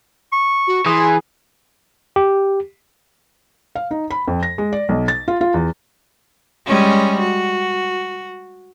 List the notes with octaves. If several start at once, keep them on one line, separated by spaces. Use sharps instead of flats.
C#6
F#4
E3 G#4 C6
G4
F5
D#4
B5
F2
A#6
G#3
D5
B1
A6
F4
F4
E2
G3 G#3 C#4
F#4